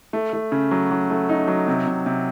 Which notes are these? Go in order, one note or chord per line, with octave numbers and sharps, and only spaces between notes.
A3
A3
C#3
F#3
F#3
A3
D#4
F#3
C3
C3
C3